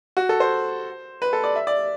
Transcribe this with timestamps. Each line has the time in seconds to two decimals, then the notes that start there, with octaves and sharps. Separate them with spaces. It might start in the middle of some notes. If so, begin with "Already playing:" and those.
0.17 F#4
0.29 A4
0.40 C5
1.22 B4
1.33 A4
1.44 D5
1.56 E5
1.67 D5